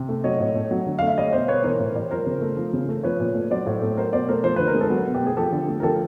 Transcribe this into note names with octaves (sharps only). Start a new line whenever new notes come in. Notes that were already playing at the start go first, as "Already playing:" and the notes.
Already playing: C3
A3
F#3 C#5 D#5
A2
A3
F#3
D3
A3 F5
E5
G3 C#5 D#5
B2 C5 D5
B2 B4 C#5
E3 A#4 C5
A2
G3
F3 A#4 C5
C#3
A3
F3
C#3
A3
F3 B4 C#5
A#2
A3
F#3 C5 D5
A2
A3
F#3 A#4 C5
B2 C5 D5
A3 A#4 C5
F3 C5
D3 B4
A#4
G#3
A4 B4
F#3
B2
G4
A3
G#4
F3 G4 A4
D3
A3
A#4
F3 G4 A4